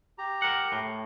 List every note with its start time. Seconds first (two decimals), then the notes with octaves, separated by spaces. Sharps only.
0.18 G4 A#5
0.42 A#4 F#5
0.72 A2